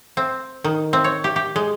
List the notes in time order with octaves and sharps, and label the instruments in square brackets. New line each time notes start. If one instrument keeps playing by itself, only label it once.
[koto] C4
D#3
C4
C#5
G4
G4
G#3